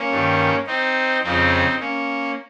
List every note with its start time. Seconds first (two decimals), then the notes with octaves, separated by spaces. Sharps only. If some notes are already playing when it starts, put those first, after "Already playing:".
Already playing: A#3 C#4
0.11 G2 D#3
0.67 C4 D#4
1.23 F2 C#3 F3 C4 D#4
1.80 A#3 C#4